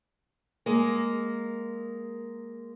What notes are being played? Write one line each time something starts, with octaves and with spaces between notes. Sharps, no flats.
G#3 A#3